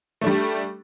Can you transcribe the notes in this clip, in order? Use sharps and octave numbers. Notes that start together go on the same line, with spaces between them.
G3 A3 D4